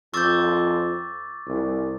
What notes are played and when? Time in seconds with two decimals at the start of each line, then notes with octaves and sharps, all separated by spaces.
0.14 F2 C#6 D6 E6 G6 A6
1.46 C2